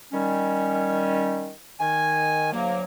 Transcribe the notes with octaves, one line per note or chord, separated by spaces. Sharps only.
D#3 G3 C#4
D#3 G#5
D2 F#3 A#3